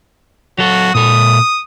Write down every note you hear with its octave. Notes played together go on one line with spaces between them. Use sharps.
F#3 F#4 A4
A#2 A4 D#6